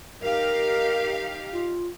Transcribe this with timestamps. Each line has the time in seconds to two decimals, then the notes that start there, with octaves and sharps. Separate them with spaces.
0.21 D#4 G4 A#4 F5
1.54 F4